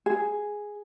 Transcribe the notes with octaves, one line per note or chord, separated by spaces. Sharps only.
G#4